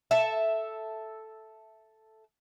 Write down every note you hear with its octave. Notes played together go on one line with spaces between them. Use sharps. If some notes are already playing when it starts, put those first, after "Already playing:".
A4 E5